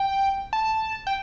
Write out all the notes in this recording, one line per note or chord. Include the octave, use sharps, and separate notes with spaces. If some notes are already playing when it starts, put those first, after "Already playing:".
Already playing: G5
A5
G5